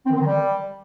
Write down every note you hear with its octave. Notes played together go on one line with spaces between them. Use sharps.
C4
D#3
C4
D#3
G3